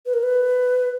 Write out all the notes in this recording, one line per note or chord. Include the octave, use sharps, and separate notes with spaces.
B4
A#4
B4